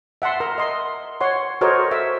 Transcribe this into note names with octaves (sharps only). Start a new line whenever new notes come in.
E5 F#5 A5 C6
A#4 A#5
D#5 C6
C#5 F#5 C6
F#4 A4 A#4 C5 C#5 D#5
E5